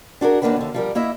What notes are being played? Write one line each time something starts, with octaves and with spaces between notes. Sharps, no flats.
D4 F#4 G#4 A#4
D#2 C3 A#3 D4 F#4 B4
D#2 D3
F3 G3 A#4
A#3 E4 D#5 E5